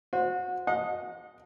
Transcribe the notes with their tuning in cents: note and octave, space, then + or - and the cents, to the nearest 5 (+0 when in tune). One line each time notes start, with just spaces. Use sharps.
F#4 -30 C5 +0
D#5 +0 F#5 -40